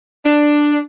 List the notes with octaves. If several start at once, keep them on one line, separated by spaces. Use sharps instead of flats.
D4